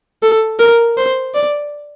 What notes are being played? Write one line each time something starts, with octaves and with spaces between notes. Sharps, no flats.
A4
A#4
C5
D5